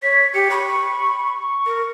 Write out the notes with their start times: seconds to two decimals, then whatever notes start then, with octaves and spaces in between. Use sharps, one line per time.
0.03 C#5 B6
0.34 G4 C#7
0.51 B5 C#6
1.34 C#6
1.66 A#4